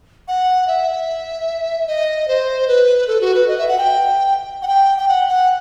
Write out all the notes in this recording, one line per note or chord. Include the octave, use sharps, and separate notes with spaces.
F#5
E5
D#5
C5
B4
A4
F#4
B4
D#5
E5
F#5
G5
F#5
G5
G5
F#5
F#5